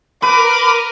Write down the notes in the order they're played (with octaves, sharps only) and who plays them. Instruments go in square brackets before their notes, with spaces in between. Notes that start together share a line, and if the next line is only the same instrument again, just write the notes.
[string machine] A#4 [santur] B4 [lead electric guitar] B5 [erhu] D6